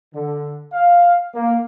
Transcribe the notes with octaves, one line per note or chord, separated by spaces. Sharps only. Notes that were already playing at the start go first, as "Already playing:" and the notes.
D3
F5
A#3